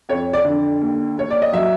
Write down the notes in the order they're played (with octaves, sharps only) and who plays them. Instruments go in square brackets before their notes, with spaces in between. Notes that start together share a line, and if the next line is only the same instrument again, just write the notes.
[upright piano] F2 C#5
D5
D3
D#2
D#2 C#5
D5
D#5
F#3 E5